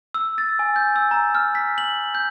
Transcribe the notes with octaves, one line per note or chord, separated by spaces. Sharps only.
E6
A6
G#5
G6
E6
A#5
F6
B6
F#7
G6